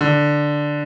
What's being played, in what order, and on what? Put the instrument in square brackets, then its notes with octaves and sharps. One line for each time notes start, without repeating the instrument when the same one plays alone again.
[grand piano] D3